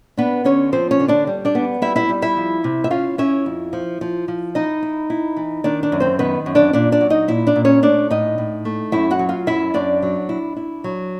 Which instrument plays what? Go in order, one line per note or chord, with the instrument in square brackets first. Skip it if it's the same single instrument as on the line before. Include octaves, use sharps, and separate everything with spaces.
[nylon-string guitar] B3 D4 B4
D3 C#4 C#5
F3 C4 C5
C#4 C#5
D3
D4 D5
G3
D4 D5
B3
G3 E4 E5
E4 E5
G3
E4 E5
F3
C3
E5
C#4 F4 F5
C#4 E4 E5
F2
F3
F3
F3
D#4 E4 D#5
E4
E4
E3
D#3 D4 D5
D4 D5
F#2
C4 C5
D#3 B3 B4
F#2
D4 D5
A#2 D4 D5
D4 D5
F#3
D#4 D#5
A#2 E4 E5
D4 D5
A#2
C#4 C#5
A3 D4 D5
A2 D#4 D#5
A2
A3
F#2 E4 E5
F#4 F#5
F#3
F4 F5
F#2 E4 E5
F#2 D4 D5
F#3
E4
E4
F#3